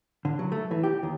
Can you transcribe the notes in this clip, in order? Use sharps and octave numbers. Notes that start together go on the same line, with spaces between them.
D3
F#3
A3
E3
G4
D#2